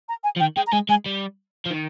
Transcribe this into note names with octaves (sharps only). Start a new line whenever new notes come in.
A#5
G#5
F3
D#3 G5
G#3 G5
A#5
G#3 G#5
G#3 G#5
G3
F3
D#3